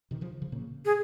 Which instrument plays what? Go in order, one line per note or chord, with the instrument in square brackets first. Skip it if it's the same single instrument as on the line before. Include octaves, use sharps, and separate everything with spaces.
[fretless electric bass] C3 D#3
C#3 F3
C#3 F3
A#2 C#3
[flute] G#4